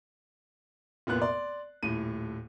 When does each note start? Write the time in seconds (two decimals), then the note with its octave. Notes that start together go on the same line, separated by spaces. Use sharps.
1.07 F1 A#2 B3 F#6
1.21 D5 C6
1.83 D#1 A2 D#7